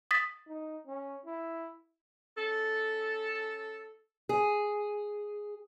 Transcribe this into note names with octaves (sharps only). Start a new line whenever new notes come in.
D#6 A6 B6
D#4
C#4
E4
C#4 A4
G#4